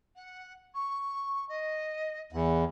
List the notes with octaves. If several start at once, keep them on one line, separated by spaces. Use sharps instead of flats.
F#5
C#6
D#5
E2 F#5